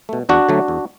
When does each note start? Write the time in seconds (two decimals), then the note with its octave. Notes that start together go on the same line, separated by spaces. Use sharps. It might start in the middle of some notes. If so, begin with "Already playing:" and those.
0.09 B2 A3
0.29 E2 D4 F#4
0.49 D3 F#3 A3
0.68 E2